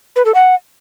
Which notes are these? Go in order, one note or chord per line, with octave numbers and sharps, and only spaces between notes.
B4
A4
F#5